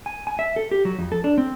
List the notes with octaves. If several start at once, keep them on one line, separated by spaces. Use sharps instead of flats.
G#5
G#5
E5
A4
G4
F#3
F2
A4
D4
C4